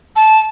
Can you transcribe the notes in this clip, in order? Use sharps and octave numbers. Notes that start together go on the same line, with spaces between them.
A5